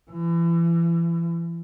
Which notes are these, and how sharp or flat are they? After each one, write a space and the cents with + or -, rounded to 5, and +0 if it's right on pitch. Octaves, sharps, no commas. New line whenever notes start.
E3 +35